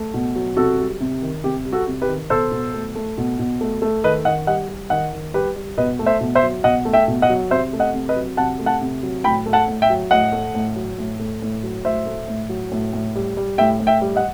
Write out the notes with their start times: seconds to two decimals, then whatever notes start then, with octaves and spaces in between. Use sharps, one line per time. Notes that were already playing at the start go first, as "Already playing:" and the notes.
Already playing: A3
0.14 B2
0.36 F#3
0.57 C3 F#4 A4
0.79 G3
1.00 C3
1.22 D#3
1.44 C3 G4
1.65 G3
1.73 F#4 A4
1.87 C3
2.02 G4 B4
2.08 D#3
2.30 B2 A4 C5
2.52 B2
2.74 A3
2.95 A3
3.18 B2
3.39 B2
3.61 A3
3.82 A3
4.04 D#3 B4 D#5
4.25 D#3 D#5 F#5
4.47 G3 D#5 F#5
4.69 G3
4.90 D#3 D#5 F#5
5.13 D#3
5.34 G3 G4 B4
5.56 G3
5.77 B2 B4 D#5
5.99 A3
6.06 C5 E5
6.21 B2
6.35 C5 E5
6.43 F#3
6.64 B2 D#5 F#5
6.85 A3
6.93 E5 G5
7.08 B2
7.22 D#5 F#5
7.30 F#3
7.51 C3 C5 E5
7.73 A3
7.80 D#5 F#5
7.94 C3
8.09 B4 D#5
8.16 F#3
8.37 C3 F#5 A5
8.59 A3
8.66 F#5 A5
8.81 C3
9.03 F#3
9.24 A2 G5 B5
9.46 A3
9.53 F#5 A5
9.68 A2
9.82 E5 G5
9.90 F#3
10.11 A2 D#5 F#5
10.32 A3
10.54 A2
10.76 F#3
10.98 A2
11.19 A3
11.42 A2
11.63 F#3
11.85 A2 C5 E5
12.06 A3
12.28 A2
12.49 F#3
12.72 A2
12.93 A2
13.15 G3
13.37 G3
13.58 A2 E5 G5
13.80 A2
13.87 E5 G5
14.01 G3
14.16 D#5 F#5